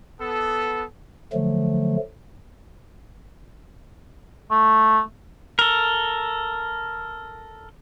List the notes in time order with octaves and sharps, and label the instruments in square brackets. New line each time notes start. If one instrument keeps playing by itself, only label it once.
[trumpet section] B3 A4
[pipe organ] D3 F3 F#3 A3
[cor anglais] A3
[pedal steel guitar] A4 A#4